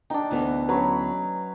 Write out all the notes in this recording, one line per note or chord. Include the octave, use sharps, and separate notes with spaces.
D4 D#4 G5
D2 E3 B3
F#3 C#4 B4